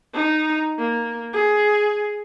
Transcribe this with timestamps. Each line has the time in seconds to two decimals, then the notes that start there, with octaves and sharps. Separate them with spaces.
0.14 D#4
0.78 A#3
1.33 G#4